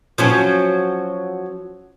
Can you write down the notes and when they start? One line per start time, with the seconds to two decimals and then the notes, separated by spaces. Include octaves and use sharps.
0.18 F3 F#3 C#4